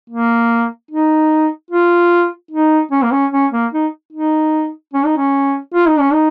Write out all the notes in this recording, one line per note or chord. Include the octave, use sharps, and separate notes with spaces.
A#3
D#4
F4
D#4
C#4
A#3
C#4
C#4
A#3
D#4
D#4
C#4
D#4
C#4
F4
D#4
C#4
D#4